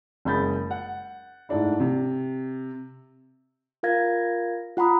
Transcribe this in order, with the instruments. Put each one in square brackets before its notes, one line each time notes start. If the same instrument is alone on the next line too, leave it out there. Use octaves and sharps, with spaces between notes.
[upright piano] F#1 G#3 B5 G6 A6
F#5
G#2 A3 D4 E4
C3
[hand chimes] F4 A#4 F5 G#6 A#6
F4 F#5 A#5 B5 D#6